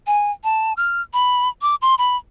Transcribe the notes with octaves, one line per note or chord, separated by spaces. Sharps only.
G#5
A5
F6
B5
D6
C6
B5